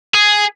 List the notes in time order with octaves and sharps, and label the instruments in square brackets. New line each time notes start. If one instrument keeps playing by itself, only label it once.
[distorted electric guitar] G#4